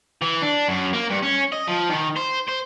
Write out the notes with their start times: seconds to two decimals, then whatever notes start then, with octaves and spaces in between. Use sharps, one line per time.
0.22 E3
0.42 D4
0.68 F#2
0.93 A#3
1.10 G2
1.23 C#4
1.52 D#5
1.68 F3
1.90 D#3
2.16 C5
2.48 C5